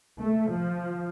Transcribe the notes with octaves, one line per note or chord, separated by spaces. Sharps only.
A3
F3